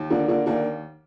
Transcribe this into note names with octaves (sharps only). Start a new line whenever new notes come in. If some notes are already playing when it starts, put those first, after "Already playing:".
Already playing: D#2
D3 A#3 D4
D3 A#3 D4
D#2 A#3 D4